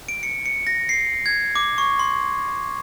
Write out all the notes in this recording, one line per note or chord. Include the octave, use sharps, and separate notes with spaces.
D7
C#7
C#7
A#6
C7
G#6
D6
C#6
C6